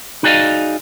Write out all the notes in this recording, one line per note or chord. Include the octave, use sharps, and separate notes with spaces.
D#4 F#4 G#4 D5 D#5 F5